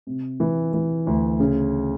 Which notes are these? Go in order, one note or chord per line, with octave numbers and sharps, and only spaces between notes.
C3
E3
E3
D2
C#3